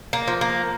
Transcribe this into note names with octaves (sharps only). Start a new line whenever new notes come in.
A#3
F3
A#3